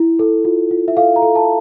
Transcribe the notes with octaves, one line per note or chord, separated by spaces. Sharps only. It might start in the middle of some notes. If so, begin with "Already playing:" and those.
Already playing: E4
A4
F4
F4
E5
A4 F5
A#5
A4
A5